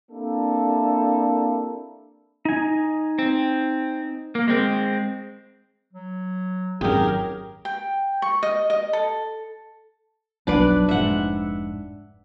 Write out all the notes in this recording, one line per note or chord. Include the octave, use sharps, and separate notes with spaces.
A#3 C4 D4 E4 G4 A4
D#4 G#5
C4
A#3
G#3 C4
F#3
G#1 F#2 G4 G#4 A#4
G5
C#6
D#5
D#5
A4
F1 B1 F#3 D4 B4 D5
F1 G#2 E5 F#5